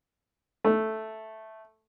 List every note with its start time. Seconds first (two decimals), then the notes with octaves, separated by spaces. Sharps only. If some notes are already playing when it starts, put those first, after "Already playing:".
0.64 A3